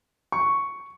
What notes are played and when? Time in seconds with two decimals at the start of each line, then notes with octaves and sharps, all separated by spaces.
0.32 C#6